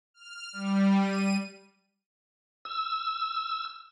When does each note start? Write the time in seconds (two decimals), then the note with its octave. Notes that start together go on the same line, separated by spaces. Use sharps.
0.14 F6
0.53 G3
0.98 D#7
2.65 E6